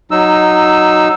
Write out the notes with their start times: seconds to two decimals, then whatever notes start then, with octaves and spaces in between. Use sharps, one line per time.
0.11 F#3 D#4 E6